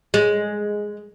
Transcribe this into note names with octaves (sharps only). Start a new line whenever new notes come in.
G#3